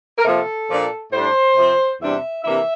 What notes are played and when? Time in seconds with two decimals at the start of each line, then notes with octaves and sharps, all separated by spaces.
0.18 A#4
0.25 C3 F3 A#3 A4
0.69 A#2 F3 A#3 D4
1.13 A2 G3 D4 C5
1.56 C3 F3 C4
2.01 E2 C3 G3 D4 E5
2.44 C3 E3 A#3 D4 E5